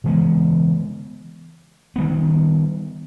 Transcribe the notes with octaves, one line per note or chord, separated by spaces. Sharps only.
C#3 E3 G#3 B3
D#3 G3 B3